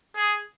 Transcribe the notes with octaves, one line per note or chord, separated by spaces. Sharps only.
G#4